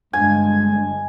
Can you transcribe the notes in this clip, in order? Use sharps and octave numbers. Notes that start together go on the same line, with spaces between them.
G1 G#3 D4 G#5